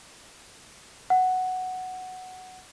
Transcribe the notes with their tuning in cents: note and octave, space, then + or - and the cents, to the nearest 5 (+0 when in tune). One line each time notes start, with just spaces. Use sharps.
F#5 +5